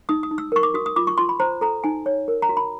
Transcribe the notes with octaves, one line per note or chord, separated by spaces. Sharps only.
D#4 D#6
D#6
D#4
E6
A#4 C#6
D6
F#4 D#6
D#6
F4 D6
C#6
F4 C6
B5
C5 A#5
A4 A#5
D#4 G#5
C#5
A#4
A#5
F#4
B5